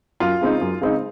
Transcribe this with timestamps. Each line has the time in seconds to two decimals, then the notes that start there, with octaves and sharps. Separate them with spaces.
0.20 F#2 F4
0.41 C#3 G#3 C4 D#4
0.61 F#2
0.81 C#3 G#3 C4 D#4